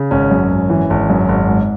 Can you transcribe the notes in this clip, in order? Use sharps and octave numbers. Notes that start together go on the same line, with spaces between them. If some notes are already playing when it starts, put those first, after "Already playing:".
Already playing: C#3
G#1 C#4
F#2
G#1
E3
G#1
F#2
G#1
G#2